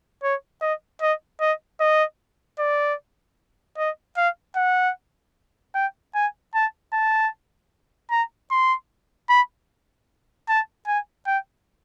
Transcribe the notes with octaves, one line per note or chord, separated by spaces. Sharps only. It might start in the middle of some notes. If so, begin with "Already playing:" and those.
C#5
D#5
D#5
D#5
D#5
D5
D#5
F5
F#5
G5
G#5
A5
A5
A#5
C6
B5
A5
G#5
G5